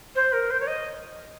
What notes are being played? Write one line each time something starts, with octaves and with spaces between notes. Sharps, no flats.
C5
A#4
C5
C#5
D#5